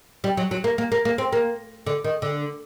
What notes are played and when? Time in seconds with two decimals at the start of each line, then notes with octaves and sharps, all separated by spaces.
0.24 G3
0.37 F#3
0.51 F#3
0.64 A#3
0.78 A#3
0.92 A#3
1.05 A#3
1.18 C4
1.33 A#3
1.86 D3
2.04 D#3
2.22 D3